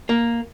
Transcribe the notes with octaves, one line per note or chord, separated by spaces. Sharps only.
A#3